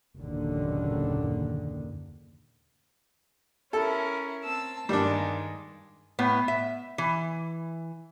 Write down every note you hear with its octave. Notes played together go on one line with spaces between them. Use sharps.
F#1 D#2 A#2 D3
C#4 E4 A4 A#4
C4 A5 E6
G2 D#3 G3 G#3 A#3 D4
A2 B3
E5
E3